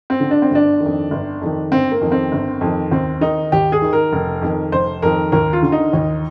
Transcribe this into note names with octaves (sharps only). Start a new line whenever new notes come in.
C4
D3
D4
C4
G1 D4
D#3
F2
G1
F2 D#3
G1 C4
A#3
F2 D#3
C4
G1
F2 D#3
D#2 C4
D#3 D#4
D#2 G4
G#4
D#3
A#4
F1
F2 D#3
F1 C5
F2 D#3 A#4
D#2 A#4
F4
D3
D#4
D#2